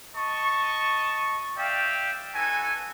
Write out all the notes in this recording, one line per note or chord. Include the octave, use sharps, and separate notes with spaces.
D#5 A5 C#6
D5 E5 F5 G5
D#4 F#4 A4 B4 G#5